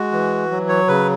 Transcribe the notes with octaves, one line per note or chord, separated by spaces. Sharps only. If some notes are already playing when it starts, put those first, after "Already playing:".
Already playing: G#3 F#4
E3
F#3
C#5
C#3 B4